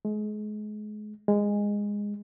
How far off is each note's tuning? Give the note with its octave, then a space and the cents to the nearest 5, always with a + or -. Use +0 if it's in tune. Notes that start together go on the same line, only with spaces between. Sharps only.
G#3 +30
G#3 -15